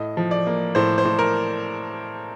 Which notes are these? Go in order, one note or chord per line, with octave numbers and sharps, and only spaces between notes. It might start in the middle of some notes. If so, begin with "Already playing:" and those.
Already playing: A2 D#5
F3
D5
A#3
A2 C5
C5
A2
A#4